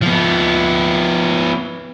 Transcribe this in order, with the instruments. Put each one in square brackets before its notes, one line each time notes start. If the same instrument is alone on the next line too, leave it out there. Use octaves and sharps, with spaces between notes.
[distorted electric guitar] F3 B3